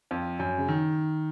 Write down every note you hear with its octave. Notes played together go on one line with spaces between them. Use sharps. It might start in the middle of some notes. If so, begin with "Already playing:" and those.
F2
F#2
C#3
D#3